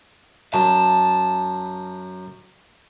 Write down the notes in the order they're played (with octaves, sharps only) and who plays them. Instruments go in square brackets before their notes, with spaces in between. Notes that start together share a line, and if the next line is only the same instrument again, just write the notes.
[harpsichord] F#2 [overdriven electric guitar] A5